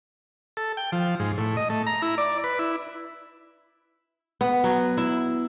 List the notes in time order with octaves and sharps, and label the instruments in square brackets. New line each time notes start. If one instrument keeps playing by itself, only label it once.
[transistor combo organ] A4
G5
F3
G#2
A2
D#5
A3
A#5
E4
D5
B4
E4
[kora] B3
F#3
E4